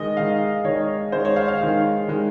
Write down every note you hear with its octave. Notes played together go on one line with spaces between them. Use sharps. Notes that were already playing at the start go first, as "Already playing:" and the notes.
Already playing: D#3 G#3 D#5
D#3 G#3 F5
D#3 G#3 C#5
D#3 G#3 C5
C#5
F5
F5
D#3 G#3
D#3 G#3